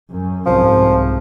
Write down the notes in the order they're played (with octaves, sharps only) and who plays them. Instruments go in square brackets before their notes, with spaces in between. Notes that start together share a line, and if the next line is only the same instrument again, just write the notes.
[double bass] F#2
[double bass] C2 G#2 [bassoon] F3